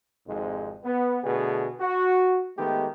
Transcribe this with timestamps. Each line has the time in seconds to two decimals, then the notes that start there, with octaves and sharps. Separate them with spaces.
0.26 G#1 F2 G#2 C3 G#3
0.84 B3
1.23 B2 D3 A3 G#4
1.80 F#4
2.57 D#3 G#3 A3 B3 G4